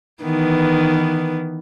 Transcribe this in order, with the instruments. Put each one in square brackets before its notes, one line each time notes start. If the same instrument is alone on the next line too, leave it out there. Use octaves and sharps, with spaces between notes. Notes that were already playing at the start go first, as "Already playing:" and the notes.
[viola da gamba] D#3 E3 B3